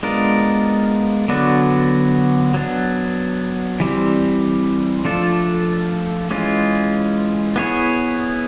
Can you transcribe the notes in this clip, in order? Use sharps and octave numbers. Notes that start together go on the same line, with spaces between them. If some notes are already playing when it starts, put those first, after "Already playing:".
G#3 B3 D4 F4 A#4
D3 F#3 B3 D4 F#4
F#3 B3 D4
E3 G3 C4
F3 A3 D4 F4 A4
E3 G#3 C#4 F4
B3 E4 G#4 C#5